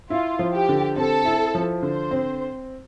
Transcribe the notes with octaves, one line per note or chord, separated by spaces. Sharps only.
E4 F4
F3
G4
D3
C4 A4
E4
F3
D3 C5
C4